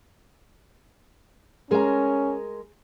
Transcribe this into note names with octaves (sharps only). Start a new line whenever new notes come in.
G#3 C#4 G#4 A#4 A#5